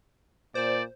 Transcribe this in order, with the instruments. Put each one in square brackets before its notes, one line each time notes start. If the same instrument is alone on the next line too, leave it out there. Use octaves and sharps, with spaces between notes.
[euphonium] A#2 [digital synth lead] C5 [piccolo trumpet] D5